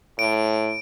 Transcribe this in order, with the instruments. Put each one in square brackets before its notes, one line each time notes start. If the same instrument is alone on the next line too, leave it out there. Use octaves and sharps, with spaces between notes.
[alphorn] A2 [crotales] D7